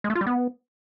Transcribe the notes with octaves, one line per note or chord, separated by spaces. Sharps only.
G#3
A3
F4
G3
B3